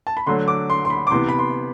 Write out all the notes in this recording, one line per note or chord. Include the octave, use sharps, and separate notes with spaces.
A5
B5
D3 F#3 A3 C6
D6
C6
C6
B5
D6
C3 E3 B3 C6
B5
C6